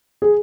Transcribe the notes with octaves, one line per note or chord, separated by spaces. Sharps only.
G#4